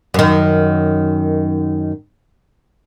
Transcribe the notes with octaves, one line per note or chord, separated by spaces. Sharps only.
F#2 D#3